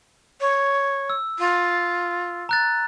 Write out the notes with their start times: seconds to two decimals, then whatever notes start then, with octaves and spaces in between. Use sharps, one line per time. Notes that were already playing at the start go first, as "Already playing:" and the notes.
0.41 C#5
1.10 E6
1.39 F4
2.49 A#5 F#6 A6